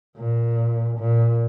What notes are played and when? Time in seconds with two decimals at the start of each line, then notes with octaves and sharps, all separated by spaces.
0.17 A#2
0.99 A#2